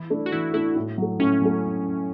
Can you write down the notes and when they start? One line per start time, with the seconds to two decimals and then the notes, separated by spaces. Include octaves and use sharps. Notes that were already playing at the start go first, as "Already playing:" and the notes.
Already playing: E3 E4
0.10 A3 D4
0.26 F#4
0.32 E3 E4
0.54 A3 D4 E4
0.76 A2
0.98 F#3 A3
1.20 A2 C#4
1.42 F#3 A3